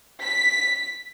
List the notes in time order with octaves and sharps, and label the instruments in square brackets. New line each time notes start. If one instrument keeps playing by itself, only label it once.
[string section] B6